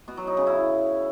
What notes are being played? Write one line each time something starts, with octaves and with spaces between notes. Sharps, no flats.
B2
F#3
D#4
C#3
E4